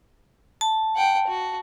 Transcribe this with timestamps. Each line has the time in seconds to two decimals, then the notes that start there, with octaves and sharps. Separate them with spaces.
0.61 A5
0.96 F#5 G5
1.27 F#4